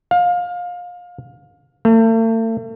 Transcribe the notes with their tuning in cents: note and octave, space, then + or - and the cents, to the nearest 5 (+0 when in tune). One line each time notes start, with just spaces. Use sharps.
F5 +25
A3 +40